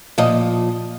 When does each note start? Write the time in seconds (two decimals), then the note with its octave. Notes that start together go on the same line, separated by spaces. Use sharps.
0.18 A#2 F3 D#5